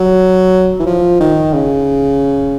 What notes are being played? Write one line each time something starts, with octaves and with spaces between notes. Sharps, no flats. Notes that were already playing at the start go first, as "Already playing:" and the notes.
Already playing: F#3
E3
F3
D#3
C#3